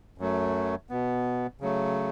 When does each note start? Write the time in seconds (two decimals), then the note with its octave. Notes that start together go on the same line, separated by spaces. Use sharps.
0.18 F#2 F#3 A3
0.90 B2 B3
1.61 C#3 F#3 A3